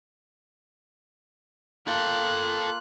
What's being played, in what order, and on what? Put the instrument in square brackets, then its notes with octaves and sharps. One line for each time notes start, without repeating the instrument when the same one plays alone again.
[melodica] A#3 F4 [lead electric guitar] A4 G5 [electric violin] F#6